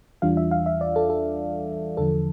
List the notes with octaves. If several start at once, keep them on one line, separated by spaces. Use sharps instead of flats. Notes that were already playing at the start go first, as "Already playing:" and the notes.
E2 E3 G3 D4 F4 F5
E5
F5
E5
D5
A4
A4
E2 D3 F3 A4